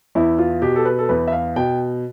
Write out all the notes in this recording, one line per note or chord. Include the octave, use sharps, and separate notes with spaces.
E2 E4
F4
B2 G4
A4
B4
A4
E2 B4
E5
F5
B2 G5